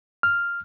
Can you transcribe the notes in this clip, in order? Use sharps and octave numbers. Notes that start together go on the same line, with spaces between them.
F6